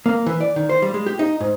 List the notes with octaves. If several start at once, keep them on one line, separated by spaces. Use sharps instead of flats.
A#3
E3
D5
D#3
C5
G3
G#3
G4
D#4
G#2